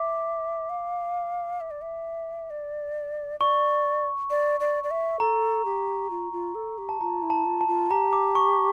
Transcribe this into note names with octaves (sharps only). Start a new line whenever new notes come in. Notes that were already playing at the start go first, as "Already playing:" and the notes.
Already playing: E5 D6
F5
E5
D5
E5
D5
D5 C#6
D5
D5
D5
E5
A4 A#5
G4
F4
F4
A4
G4
A5
F4 A#5
E4
A5
F4
A5
F4
G4 A#5
D6
C#6